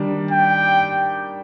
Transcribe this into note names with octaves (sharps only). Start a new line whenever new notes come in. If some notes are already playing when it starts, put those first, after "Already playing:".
Already playing: D#3 G3 D4
G5